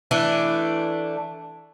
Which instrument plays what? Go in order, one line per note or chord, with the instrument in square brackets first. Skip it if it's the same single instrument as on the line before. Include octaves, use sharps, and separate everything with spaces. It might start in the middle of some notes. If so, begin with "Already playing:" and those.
[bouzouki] E3 A3 D4